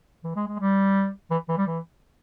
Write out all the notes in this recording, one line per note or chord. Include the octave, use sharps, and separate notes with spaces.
E3
G#3
G#3
G3
E3
E3
G3
E3